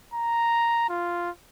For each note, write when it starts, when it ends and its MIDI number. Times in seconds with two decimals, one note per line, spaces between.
0.14 0.86 82
0.89 1.30 65